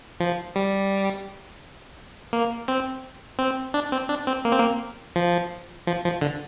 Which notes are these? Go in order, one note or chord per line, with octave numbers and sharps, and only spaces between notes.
F3
G3
A#3
C4
C4
D4
C4
D4
C4
A#3
C4
A#3
F3
F3
F3
D3